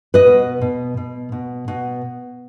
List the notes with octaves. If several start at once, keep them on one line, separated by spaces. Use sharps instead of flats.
B4 D#5
B2
B2
B2
B2
B2